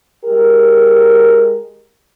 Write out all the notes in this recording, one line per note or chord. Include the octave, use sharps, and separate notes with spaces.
G#3 G4 A#4